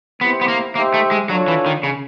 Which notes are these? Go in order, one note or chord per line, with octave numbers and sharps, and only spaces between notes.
B3 C4 E4 G4 C5
B3
A#3
A#3 D#4 G4 C5 E5
A3
G#3
F#3 D4 F4 A4 C#5
E3
D#3
C#3